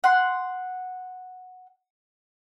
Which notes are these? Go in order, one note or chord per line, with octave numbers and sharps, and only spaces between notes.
F#5 C6